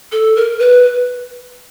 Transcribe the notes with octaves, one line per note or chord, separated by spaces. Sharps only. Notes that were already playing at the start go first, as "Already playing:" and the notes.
A4
A#4
B4